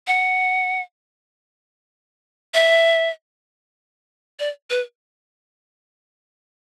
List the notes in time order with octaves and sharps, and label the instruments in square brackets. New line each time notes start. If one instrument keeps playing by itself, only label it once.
[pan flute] F#5
E5
D5
B4